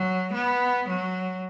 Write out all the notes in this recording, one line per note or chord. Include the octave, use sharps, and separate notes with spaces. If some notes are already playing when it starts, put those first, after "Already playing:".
Already playing: F#3
B3
F#3